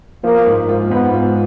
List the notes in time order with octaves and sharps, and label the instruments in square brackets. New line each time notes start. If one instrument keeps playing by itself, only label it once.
[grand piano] F3 [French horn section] A#3
[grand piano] G#2
F4
[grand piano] G#2 [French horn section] B3
[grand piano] F4